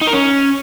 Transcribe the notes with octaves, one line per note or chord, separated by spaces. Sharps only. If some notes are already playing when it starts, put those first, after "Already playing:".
D#4
A#4
C#4